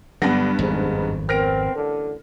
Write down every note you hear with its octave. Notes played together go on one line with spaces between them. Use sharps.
G2 D3 F#3 G3 B3 B4 A#6
G#1 F2 G#2
B3 C4 A#4 F6 A#6 D7
A1 D3